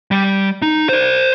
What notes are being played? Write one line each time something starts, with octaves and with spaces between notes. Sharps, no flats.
G3
D#4
C5 D5